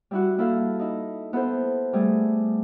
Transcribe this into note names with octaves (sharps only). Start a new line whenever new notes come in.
G3 E4 F#4
A#3 E4 A4 F5
D#4 E4
B3 E4 A4 C5
G3 A3 G#4